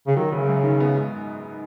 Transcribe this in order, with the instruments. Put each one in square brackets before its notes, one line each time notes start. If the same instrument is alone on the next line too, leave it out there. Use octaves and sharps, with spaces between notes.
[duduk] C#3
[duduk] D#3 [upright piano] F#3
[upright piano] F#1 [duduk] C#3
[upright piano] F#2
D#3
B3
G#2